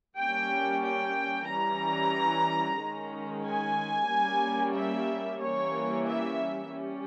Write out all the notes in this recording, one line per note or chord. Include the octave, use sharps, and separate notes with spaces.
G3 A#3 C#4 G5
G5
E3 G3 C#4 A#5
D#3 G#3 C#4
G#5
G3 A#3 C#4
E5
E3 G3 A#3 C#4 C#5
E5
G3 C#4